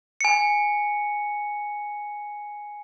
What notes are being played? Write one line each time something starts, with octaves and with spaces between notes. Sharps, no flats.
G#5 C#7